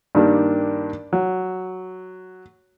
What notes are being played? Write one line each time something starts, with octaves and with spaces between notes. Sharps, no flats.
G2 D#3 A#3 D4 G4
F#3